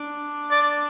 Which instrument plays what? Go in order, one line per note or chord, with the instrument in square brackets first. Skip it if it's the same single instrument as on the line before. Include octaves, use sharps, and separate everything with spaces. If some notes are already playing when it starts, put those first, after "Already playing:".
Already playing: [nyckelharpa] D4
[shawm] D5